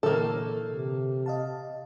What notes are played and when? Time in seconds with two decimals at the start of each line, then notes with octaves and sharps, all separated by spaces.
0.03 A#2 D3 E3 A#3 A4
0.66 C3
1.26 D#5 F5 A5